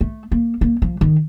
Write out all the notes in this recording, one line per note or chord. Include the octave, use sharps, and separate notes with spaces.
A3
A#3
A#3
F3
D#3